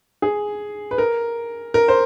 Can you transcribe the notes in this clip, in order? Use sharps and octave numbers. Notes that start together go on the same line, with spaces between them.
G#4
B4
A#4
A#4
C5